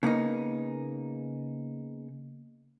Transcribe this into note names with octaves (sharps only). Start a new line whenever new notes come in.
C#3 A#3 B3 D#4